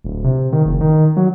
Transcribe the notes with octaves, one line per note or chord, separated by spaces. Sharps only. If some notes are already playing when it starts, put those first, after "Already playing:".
D1
C3
C3
D#3
F#1
D#3
F#3